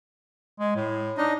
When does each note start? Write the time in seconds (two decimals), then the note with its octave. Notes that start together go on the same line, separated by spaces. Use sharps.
0.59 G#3
0.76 A2
1.18 D4 D#4 D#5